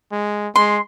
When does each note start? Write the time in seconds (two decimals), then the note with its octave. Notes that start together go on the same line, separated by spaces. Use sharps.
0.12 G#3
0.56 G#3 C6